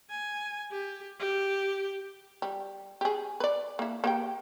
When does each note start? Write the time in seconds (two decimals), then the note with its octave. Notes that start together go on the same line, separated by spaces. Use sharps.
0.10 G#5
0.72 G4
1.20 G4
2.42 G3
3.01 G4 G#4
3.40 B4 D5
3.79 A#3 E4
4.04 A#3 G4 G5